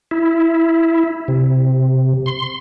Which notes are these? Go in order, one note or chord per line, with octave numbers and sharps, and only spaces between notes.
E4
C3
C6